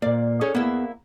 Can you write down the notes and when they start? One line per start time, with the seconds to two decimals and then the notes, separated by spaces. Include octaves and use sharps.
0.02 A#2 A#3 D5
0.41 C#4 G#4 A4 C#5
0.55 A#3 B3 E4 G#4